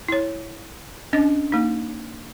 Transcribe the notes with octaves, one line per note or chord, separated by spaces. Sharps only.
E4 C#5
C#4 D4 D#5
A#3 D#4